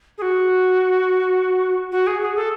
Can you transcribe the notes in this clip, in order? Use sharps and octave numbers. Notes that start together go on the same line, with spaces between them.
G#4
F#4
F#4
G#4
G#4
A4